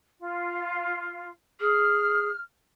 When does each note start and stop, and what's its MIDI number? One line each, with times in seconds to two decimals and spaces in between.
0.19 1.30 65
1.61 2.29 68
1.61 2.40 89